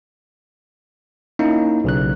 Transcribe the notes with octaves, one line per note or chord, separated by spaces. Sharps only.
A#3 C#4 D#4 E4
B1 C#3 F#6